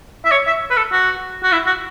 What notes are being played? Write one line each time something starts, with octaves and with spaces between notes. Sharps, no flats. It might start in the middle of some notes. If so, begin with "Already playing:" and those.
E5
C#5
E5
B4
A4
F#4
F#4
E4
F#4